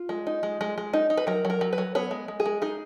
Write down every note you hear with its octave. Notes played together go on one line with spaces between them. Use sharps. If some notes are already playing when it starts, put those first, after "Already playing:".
Already playing: F4
G#3
D#4
G#3
G#3
G#3
D#4
D#4
B4
F#3 A#4
F#3
A#4
F#3
B4
F#3
B3 C#5
G#3
G#3
G#4
G#3
D#4 G#4